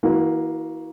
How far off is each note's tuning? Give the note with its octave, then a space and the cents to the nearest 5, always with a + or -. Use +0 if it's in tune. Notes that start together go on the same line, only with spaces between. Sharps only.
E3 -25 A#3 +10 F#4 +0